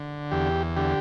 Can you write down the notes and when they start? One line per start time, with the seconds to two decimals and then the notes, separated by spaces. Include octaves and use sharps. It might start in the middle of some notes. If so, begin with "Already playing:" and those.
Already playing: D3
0.31 E2 G4
0.76 D3 G4